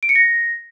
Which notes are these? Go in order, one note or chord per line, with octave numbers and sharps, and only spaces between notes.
D7
C#7
A#6